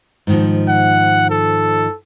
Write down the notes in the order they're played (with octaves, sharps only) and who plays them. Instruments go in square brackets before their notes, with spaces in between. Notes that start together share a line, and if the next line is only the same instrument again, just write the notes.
[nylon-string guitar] G#2 D#3 F3
[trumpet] F#5
A4